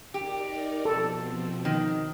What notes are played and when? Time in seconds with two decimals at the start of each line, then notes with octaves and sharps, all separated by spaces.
0.14 D#4 G4 A#4 D5
0.85 B2 F3 C4 A4
1.65 D#3